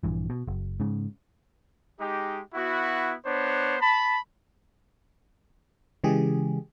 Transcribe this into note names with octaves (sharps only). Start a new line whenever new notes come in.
A#1 G2 E3
B2
F#1
G#2 C#3
G#3 D#4 G4
B3 E4 F#4
B3 D4 C5 C#5
A5 B5
C#3 E3 G#3 G4 G#4